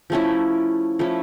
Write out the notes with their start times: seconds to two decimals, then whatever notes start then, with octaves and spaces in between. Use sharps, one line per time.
0.10 F3 A3 C#4 E4
0.99 F3 A3 C#4 E4